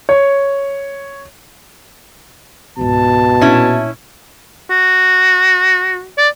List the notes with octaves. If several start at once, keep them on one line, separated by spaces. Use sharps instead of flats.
C#5
C#2 G#2 B2 A5
A#2 C#4 E4
F#4
D5